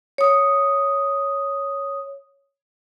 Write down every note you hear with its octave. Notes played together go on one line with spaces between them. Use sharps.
C#5 D#6